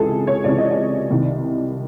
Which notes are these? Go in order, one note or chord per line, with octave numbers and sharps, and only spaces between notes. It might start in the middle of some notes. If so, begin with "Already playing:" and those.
Already playing: C#2 C3 E3 G#4 A4
C#5
C#2 C3 E3 D5
D#5
D5
C2 C3 D#3